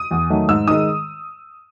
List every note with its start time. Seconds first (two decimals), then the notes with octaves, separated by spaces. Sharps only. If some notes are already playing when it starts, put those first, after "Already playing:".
Already playing: D#6
0.11 E2
0.30 D#3 F#3 A3
0.49 G#2 E6
0.68 D#3 G#3 D#6